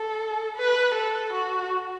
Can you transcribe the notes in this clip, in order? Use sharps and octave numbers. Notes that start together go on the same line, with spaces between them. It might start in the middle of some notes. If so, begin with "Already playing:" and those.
Already playing: A4
B4
A4
F#4